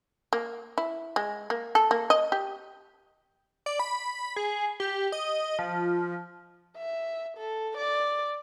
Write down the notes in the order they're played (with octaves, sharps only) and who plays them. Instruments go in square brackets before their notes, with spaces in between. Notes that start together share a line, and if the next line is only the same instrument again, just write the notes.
[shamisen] A#3
E4
G#3
A#3
A4
A#3
D#5
G4
[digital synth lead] D5
B5
G#4
G4
D#5
F3
[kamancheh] E5
A4
D5